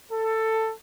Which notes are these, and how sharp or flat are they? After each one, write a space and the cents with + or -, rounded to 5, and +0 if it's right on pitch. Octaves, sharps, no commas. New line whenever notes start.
A4 +15